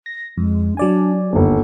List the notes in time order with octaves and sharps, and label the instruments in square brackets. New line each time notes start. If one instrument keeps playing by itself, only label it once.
[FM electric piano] A#6
[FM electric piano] F2 [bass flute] G#3
[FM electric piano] F#3 D5 G#5 [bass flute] D4
[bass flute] F#4
[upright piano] G1 D#2 [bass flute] A4